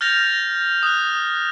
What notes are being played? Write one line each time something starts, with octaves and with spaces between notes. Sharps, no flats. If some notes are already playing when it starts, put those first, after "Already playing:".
F6 G6 A6 A#6 F7
D#6 F#6